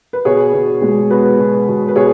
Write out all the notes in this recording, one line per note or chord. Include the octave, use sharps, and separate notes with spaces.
B4
B2 G#4 C#5
B2
G#3
B3 F#4 B4
B2
B2
B4
B2 G#4 C#5